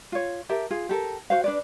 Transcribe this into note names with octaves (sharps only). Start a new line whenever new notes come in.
F4 C#5
G4 A4 A#4 E5
F4 G#4
G4 A4 A#4
F#4 C5 F5
D4 B4 D5